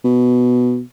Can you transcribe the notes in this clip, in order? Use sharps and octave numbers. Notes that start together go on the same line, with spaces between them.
B2